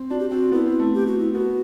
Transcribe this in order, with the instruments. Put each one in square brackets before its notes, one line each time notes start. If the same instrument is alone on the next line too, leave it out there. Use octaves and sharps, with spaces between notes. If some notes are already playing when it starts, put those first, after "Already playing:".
Already playing: [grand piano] C4
[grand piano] D4 [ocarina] F#4
[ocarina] G4
[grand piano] C4 [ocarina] F#4
[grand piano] B3 [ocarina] E4
[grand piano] C4
A3
[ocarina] G4
F#4
E4
[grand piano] B3 [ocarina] F#4